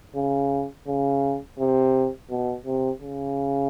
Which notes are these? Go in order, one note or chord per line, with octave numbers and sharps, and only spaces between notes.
C#3
C#3
C3
B2
C3
C#3